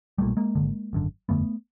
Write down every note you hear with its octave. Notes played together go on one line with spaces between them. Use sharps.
B1 A#2 G3 A3
G#3 A#3
G#1 G2 D3
G#1 F#2 D3
G1 F2 D3 A3 B3